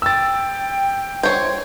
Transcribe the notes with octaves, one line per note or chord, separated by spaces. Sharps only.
G5 E6 A6
C5 C#5